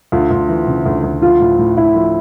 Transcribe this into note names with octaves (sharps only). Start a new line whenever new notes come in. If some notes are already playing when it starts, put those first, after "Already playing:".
D2 F4
D2
E3
C#3
D2
D2
F3 F4
A2
A2
A2 E4
F3